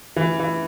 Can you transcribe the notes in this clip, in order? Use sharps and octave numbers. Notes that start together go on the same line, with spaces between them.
E3
E3